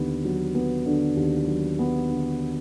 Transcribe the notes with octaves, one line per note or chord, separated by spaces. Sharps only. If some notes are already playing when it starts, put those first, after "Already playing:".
Already playing: D#2 D3 B3
F#3
B3
D3
D#2
F#3
B3
D3